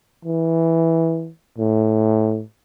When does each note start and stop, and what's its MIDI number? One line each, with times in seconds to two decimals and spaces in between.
0.25 1.30 52
1.58 2.42 45